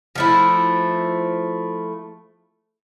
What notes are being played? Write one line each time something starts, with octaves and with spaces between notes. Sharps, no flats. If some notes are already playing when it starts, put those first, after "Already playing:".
F3 A3 E4